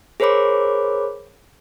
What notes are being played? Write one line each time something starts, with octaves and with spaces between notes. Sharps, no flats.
G#4 A#4 C5 C#5 B5 D6